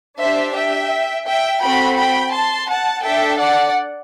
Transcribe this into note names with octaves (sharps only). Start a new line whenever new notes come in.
D4 G4 C5 E5
E5 G5
E5 G5
C4 F#4 A4 G5 B5
G5 B5
A5 C6
F#5 A5
D4 A4 E5 G5
D5 F#5